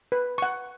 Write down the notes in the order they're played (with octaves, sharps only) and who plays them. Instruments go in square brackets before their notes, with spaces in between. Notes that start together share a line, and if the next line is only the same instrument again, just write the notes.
[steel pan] B4
F#5 C#6